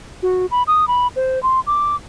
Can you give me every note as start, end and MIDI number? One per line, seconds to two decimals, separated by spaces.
0.23 0.46 66
0.51 0.63 83
0.67 0.85 87
0.88 1.07 83
1.16 1.41 72
1.43 1.60 84
1.67 1.96 86